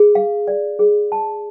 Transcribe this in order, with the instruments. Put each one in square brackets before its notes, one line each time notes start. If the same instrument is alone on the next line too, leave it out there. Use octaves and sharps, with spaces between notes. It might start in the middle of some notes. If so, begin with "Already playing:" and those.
Already playing: [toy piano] G#4
F5
D5
G#4
A5